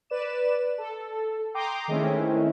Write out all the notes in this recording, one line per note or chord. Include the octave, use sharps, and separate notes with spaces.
B4 D5 E7
A4
G5 A#5 C6 D6 D#6 G6
D#3 G#3 A3 C4 C#4 E4